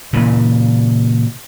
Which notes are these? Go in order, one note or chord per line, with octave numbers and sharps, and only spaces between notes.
A#2 C#3 E3